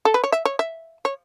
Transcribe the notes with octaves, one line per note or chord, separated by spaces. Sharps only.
A4
B4
C#5
E5
C#5
E5
C#5